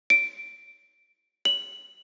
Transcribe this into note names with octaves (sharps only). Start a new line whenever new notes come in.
D7
F#7